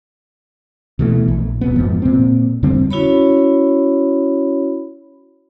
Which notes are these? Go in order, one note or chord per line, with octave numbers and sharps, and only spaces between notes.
B2 E3 G3 A3
A#1
D#1 A#2 B3
F2 G#2 F3
A#2 C4
F2 D3 G3 C4
C#4 E4 F#4 C#5 B5